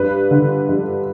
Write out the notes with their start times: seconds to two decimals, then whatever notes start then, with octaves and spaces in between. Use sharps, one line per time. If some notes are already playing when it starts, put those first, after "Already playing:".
Already playing: G2 B4
0.31 D3
0.69 G2